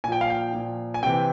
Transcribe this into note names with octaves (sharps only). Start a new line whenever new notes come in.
A#2 F3 G5 G#5
F5
G5
A#2 F3
G#5
C3 E3 G5